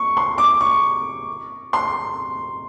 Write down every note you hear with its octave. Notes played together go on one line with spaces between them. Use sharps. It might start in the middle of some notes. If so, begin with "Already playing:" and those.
Already playing: C#6
C6
D6
C#6
C6